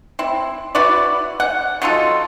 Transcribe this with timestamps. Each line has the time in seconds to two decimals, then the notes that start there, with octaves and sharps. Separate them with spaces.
0.19 C4 E4
0.75 E4 F#4 B4 D5
1.40 F#5
1.82 F#3 D#4 F4 A4